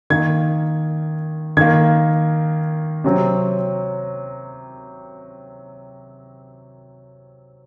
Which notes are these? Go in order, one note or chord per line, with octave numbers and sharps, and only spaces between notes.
D#3 A#3 G#6
D#3 A#3 G#6
C3 F#3 C4